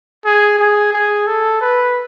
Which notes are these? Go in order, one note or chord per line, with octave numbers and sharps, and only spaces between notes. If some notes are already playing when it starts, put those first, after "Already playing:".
G#4
G#4
G#4
A4
B4